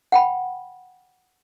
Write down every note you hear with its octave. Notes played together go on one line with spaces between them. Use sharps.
F#5 G5 B5